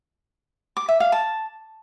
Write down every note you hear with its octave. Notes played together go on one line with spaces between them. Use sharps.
D6
E5
F5
A5